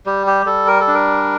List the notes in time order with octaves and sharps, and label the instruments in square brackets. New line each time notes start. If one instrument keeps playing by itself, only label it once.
[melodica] G3 G4
G4
G3 A4
A#4
A4
D4
A#4